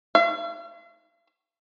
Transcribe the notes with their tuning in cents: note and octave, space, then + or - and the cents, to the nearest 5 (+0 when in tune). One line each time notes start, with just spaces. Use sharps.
F5 -45